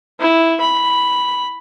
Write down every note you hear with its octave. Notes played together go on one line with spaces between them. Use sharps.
E4
B5